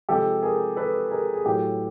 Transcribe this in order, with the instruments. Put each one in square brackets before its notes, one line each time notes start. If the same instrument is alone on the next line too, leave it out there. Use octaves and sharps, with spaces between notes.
[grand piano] C3 F3 G#3 G4 A4
G#4 A#4
A4 B4
G#4 A#4
G#4
A2 F#3 G4 A4